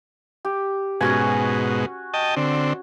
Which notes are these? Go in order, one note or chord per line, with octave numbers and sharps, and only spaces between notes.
G4
G#2 B2 C#4 F#4 G#5
D#5 G5 A5
D3 C4